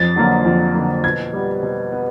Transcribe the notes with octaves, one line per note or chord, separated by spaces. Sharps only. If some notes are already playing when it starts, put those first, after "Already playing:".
Already playing: F2 A6
D3 F#3 A#3
F2
D3 F#3 A#3
B2 G#6
G3 B3
B2
B3